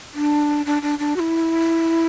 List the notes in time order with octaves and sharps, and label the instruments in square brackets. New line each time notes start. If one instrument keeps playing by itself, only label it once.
[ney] D4
D4
D4
D4
F#4
E4